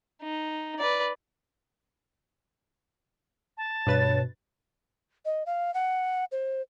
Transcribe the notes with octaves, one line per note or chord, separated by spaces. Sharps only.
D#4
B4 D5
A5
G2 B2 B4 C#5 A6
D#5
F5
F#5
C5